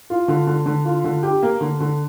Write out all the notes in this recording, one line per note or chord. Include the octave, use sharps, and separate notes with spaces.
F4
D3
D3
D3
F4
D3
G4
A#3
D3
D3